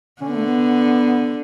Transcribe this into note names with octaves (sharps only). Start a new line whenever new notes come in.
D3 C#4
B3
A3
B3